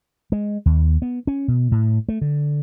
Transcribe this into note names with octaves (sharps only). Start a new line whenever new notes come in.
G#3
D#2
B3
C#4
B2
A2
A3
D3